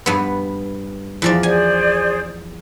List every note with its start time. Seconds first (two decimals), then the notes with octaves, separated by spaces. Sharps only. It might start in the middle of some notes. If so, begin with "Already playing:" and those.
0.06 G2 B3
1.22 E2 F3 D5
1.43 G#4 C5 D5 G#5